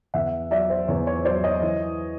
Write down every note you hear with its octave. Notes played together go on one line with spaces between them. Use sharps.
E2 E5 F#5
F#3 D5 E5
C5
E2 C#5
C#5
F#3 C5 D5
C#5 D#5
E3